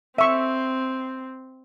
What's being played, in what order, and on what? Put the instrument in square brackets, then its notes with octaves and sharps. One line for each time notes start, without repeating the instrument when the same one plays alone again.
[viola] C4 [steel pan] E5 C#6